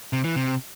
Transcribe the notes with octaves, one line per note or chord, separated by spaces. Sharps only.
C3
E3
C3